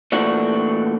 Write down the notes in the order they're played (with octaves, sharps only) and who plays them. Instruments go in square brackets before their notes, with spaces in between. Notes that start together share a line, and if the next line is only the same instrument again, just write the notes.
[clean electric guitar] A#2 E3 A3 D4 F#4